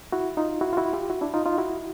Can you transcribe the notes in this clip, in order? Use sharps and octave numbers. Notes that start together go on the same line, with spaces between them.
E4 F#4
D#4 F4
E4 F#4
F4
E4 F#4
F4 G4
E4 F#4
D4 E4
D#4 F4
D#4 F4
E4 F#4